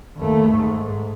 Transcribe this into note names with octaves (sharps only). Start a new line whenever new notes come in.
D#2 A3
G#2